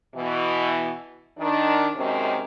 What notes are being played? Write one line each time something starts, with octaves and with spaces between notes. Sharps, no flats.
B2 E3
D#3 D4
F#2 C3 D#3 G#3 C4 C#4